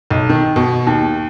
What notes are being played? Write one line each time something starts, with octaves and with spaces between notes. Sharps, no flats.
B1
D#3
B2
D#2